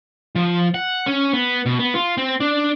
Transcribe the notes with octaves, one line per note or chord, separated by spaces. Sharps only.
F3
F#5
C#4
B3
B2
B3
F4
C4
D4